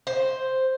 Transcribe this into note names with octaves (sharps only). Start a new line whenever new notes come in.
C5